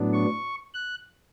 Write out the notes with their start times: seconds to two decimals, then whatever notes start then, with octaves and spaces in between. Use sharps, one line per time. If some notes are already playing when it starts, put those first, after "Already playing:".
Already playing: A2 F#3 B3 D4
0.13 C#6
0.74 F#6